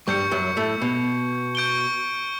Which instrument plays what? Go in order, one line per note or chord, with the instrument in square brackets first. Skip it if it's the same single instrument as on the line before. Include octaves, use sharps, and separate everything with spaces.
[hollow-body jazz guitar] G2 G3 [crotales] C#6 G6 C#7
[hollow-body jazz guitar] F#2 F#3
A2 A3
B2
[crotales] C#6 G6 D7 G7